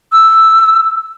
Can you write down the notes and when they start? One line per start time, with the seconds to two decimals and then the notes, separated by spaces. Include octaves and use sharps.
0.11 E6